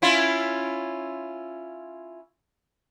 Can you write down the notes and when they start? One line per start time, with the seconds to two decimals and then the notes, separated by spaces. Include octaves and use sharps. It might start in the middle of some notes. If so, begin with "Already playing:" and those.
0.02 C#4 E4 F4